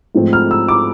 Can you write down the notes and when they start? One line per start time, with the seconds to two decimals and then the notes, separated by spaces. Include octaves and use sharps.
0.15 G#2 F3 A3 C4
0.33 F6
0.51 E6
0.68 D6